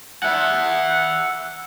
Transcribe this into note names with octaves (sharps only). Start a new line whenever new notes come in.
E5 F#5